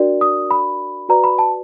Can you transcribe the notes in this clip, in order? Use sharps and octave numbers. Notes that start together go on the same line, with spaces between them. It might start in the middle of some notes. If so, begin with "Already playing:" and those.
Already playing: D4 F#4 A#4 D5
D#6
B5
F#4 B4 D5 A#5
B5
A5